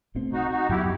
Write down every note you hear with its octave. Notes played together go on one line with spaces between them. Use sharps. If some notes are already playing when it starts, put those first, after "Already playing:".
C2 B2 A3 C4
D#4 F#4
D#4 F#4
F#2 F#3 B3 E4 G4